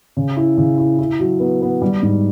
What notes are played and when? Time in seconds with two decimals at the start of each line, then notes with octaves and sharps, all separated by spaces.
0.17 C#3
0.36 E4
0.57 C#3
0.78 E4
0.99 E4
1.20 F#3
1.40 B3
1.62 B3
1.82 G3
2.02 G#2